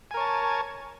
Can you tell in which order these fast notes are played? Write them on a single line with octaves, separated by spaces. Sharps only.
G#5 A#4 C#5 A5